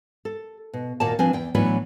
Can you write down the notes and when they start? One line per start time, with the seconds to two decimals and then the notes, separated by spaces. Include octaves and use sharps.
0.25 A4
0.73 B2
1.00 D#2 A#2 A#3 F#4 D5 A5
1.19 F3 C4 D4 B4 G#5
1.33 E2 G5
1.55 A2 E3 F#3 B3 D4 B4